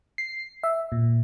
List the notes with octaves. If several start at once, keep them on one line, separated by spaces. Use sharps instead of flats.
C7
E5
A#2